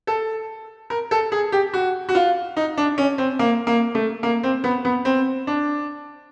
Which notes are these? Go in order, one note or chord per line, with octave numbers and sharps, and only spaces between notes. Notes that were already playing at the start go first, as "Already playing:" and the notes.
A4
A#4
A4
G#4
G4
F#4
F#4
F4
D#4
D4
C#4
C4
A#3
A#3
A3
A#3
C4
B3
B3
C4
D4